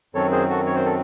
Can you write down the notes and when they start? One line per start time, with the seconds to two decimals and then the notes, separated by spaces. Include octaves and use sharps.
0.15 F#2 D#3 F#3 C4 A4 C#5
0.32 G#4 C5
0.49 F#4 A4
0.66 C#5
0.76 C5
0.86 A4